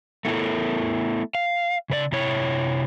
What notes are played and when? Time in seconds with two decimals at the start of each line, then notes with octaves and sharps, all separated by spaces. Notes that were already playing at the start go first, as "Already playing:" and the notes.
0.25 A3 B3 E4 A4 A#4
1.35 F5
1.90 C#3 B4 D5
2.12 C3 E4 C#5